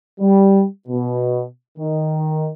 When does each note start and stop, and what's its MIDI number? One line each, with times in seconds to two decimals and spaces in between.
0.20 0.63 55
0.88 1.43 47
1.78 2.49 51